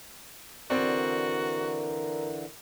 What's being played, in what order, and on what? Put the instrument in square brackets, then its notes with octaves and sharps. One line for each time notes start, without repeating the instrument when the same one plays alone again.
[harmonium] D3 E3 [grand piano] C4 D5 [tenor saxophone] F#4 [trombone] A#4